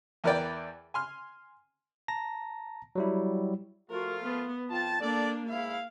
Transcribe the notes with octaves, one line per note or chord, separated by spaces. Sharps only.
E2 E3 A#4 B4 D5 G5
G#5 C6 F6
A5 A#5 A#6
F#3 G3 E4
F3 A3 F4 F#4 A#4
B3
F2 F4 G5 A5
A#3 D4 A4 D5
G#2 E4 F5